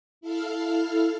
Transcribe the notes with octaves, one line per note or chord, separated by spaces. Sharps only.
E4 A4 F5 F6